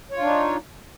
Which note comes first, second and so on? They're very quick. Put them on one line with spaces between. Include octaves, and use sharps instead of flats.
C#5 F4 D4 D#4